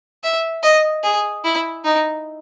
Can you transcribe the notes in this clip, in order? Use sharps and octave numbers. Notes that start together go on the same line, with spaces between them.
E5
D#5
G#4
E4
D#4